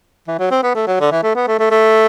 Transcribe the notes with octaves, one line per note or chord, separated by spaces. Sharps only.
E3
F#3
C4
B3
A3
F#3
D3
E3
A3
B3
A3
A3
A3